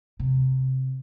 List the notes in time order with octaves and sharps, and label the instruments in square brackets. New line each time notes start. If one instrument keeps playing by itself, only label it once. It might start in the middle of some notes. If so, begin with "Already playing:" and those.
[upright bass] C3